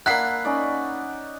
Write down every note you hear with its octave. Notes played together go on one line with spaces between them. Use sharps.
A#3 D4 E4 F#5 F#6 B6 C7
C#4 D#4 D5